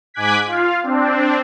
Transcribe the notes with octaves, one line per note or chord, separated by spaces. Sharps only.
G#2 G#5 D6 F#6 G#6 B6
F4 F5
C4 D4